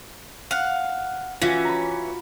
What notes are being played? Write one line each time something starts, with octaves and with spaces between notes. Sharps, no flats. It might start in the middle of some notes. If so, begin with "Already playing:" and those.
F5 F#5
E3 C#4 F4 F#4
A#5 B5